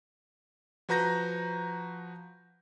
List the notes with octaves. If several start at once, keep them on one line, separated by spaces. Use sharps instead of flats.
F3 F#4 B4 A#5 G6 A#6